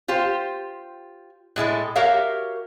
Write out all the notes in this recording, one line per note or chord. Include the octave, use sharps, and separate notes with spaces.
F4 G4 C5
A2 G#3 E4 A4
F#4 G4 A#4 C#5 E5 F5